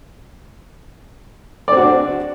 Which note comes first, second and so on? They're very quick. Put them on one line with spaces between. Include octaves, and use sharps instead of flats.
D5 C4 F#4 D4